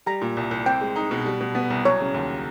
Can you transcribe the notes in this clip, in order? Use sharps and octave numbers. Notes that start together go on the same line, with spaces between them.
G3 A#5
A#2
C2
C2
C4 G5
G#3
D#4
B2
G3
B2
B3
C2
F#3 C#5
C#3
D#2